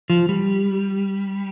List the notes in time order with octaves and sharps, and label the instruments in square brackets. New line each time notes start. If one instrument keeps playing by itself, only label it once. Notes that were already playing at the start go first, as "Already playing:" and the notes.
[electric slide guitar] F3
G3